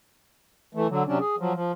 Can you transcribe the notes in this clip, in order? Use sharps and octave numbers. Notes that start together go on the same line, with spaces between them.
E3 A3
D3 F#3
C3 F#3 C#4 D4
G#4
F3 F#3
F3